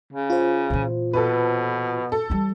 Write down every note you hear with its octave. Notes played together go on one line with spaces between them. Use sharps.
C#3
F4 C5
A#2 E3
B2 A4 B4
A4
E3 G3